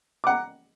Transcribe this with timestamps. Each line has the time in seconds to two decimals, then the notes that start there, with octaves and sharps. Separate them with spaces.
0.24 D6
0.27 F#5
0.30 A#5